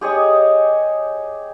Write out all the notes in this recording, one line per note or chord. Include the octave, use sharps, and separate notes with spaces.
G4 G#4 C#5 D#5